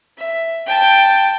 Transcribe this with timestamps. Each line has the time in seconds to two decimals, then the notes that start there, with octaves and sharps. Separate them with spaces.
0.18 E5
0.66 G5 A5